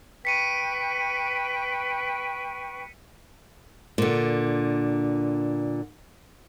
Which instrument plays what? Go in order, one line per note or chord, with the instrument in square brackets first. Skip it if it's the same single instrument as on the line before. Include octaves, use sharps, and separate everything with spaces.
[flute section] B4 G5 C#6 [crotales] B6 C#7 D#7
[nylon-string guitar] A#2 D3